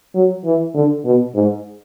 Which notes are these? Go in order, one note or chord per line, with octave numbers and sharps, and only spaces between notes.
F#3
E3
D3
B2
G#2